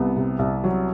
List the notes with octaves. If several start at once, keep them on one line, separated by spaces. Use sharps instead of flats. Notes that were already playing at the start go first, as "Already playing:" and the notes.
Already playing: C2 B3
C3
C2
F#3